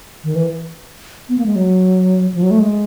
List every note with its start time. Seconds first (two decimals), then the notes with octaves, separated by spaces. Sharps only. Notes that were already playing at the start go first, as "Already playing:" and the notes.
0.24 D#3
0.35 E3
1.29 B3
1.38 A#3
1.46 G#3
1.56 F#3
2.34 F3
2.43 F#3
2.51 A3
2.60 G#3